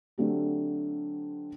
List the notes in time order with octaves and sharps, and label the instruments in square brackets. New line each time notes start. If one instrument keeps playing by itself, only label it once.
[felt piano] D3 F#3 A3 C4 G4